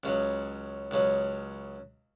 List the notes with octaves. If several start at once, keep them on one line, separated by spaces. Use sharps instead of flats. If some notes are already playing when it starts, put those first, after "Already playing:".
C#2 C#3 F#3
C#2 C#3 F#3